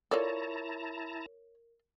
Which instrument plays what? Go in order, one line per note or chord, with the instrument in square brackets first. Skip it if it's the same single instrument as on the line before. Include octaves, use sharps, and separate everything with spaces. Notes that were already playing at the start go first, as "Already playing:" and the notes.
[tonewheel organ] E4 A5 A#5 [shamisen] F4 A4 D5 [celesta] A#4 [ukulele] C#5